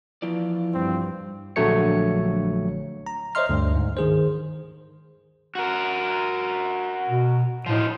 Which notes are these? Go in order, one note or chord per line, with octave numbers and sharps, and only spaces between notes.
E3 F3 F4 D5
G2 C4
A#1 D3 F#3 A3 C#5 C#7
A#5
C5 C#5 D#5 E5 C6 F6
D2 G2
G#2
D#3 G#4 C5
F#4 A#4
B2
A2 F3 D#4